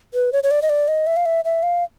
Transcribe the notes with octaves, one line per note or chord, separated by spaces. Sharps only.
B4
C#5
C#5
D5
D#5
D5
D#5
E5
F5
E5
E5
F5